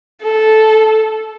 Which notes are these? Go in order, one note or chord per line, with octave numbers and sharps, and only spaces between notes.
A4